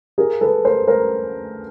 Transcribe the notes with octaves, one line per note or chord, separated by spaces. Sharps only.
G#4 A#4
A4 B4
A#4 C5
A#4 C5